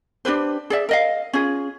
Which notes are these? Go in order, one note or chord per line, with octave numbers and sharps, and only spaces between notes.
D4 G4 B4 C5
G#4 D5 E5
A#4 D#5 F5
C#4 F4 G#4